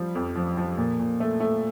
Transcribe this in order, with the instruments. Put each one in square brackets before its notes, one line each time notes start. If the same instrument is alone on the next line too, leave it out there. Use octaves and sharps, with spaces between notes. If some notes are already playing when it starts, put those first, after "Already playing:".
Already playing: [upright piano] F3 G3
F2
F3
F3
A#2
A#2
A3
A3